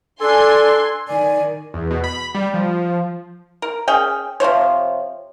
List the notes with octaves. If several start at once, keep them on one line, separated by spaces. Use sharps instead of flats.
D4 A4 G#5 C6
D#3 D5 G#5
E2
B2
B5
G3
F3
A#4
C#4 G#4 G5
C3 F3 C5 C#5